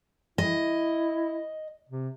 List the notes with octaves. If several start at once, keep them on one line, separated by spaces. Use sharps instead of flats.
E4 D#5
C3